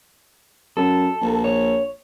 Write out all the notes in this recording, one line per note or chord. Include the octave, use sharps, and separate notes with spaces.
F#2 A4
A#1
C#5